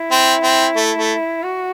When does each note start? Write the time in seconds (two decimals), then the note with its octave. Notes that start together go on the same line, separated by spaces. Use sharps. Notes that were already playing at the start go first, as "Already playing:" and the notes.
Already playing: E4
0.11 C4
0.43 C4
0.76 A3
0.98 A3
1.43 F#4